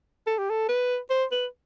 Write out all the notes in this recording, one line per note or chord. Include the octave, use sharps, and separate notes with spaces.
A4
G4
A4
B4
C5
B4